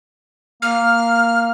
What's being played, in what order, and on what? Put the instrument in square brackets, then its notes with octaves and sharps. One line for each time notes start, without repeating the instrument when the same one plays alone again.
[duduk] A#3 [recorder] F6